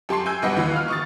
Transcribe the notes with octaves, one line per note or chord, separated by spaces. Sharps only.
F#2 G4 A5 C6 C7
G#5 E6 G6
B1 G3 B3 D#5 F#5 C7
D#2 E3 F#4 B4
F5 F6
C#6 D#6 A6